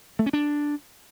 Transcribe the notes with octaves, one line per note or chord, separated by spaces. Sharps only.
A3
C#4
D4